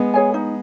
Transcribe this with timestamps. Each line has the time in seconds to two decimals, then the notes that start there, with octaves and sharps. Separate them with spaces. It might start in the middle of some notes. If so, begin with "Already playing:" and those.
Already playing: G#3 B3
0.14 G#4 C#5 G#5
0.34 D#4